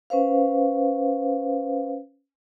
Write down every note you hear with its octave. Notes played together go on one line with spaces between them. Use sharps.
C#4 B4 C5 F5